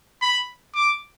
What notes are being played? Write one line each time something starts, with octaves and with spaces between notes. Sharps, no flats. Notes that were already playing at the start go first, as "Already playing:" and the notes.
B5
D6